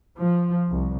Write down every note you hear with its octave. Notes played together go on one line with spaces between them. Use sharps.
F3
C2